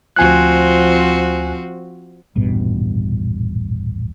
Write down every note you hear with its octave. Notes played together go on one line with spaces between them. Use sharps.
D2 F3 C4 F#4 G#5 F#6
D#1 A1 G2 B2